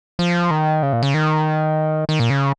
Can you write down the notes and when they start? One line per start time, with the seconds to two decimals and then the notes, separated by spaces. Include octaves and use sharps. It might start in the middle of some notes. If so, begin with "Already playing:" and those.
0.19 F3
0.51 D#3
0.83 C#3
0.93 A#2
1.03 C#3
1.14 D#3
2.09 D#3
2.20 A#2
2.30 C#3